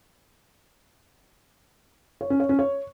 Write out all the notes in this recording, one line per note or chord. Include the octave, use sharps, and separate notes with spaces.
C#5
C#4
C#5
C#4
C#5